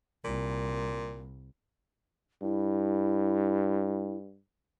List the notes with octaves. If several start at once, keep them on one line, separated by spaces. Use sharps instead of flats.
C2 A#2
G2 E4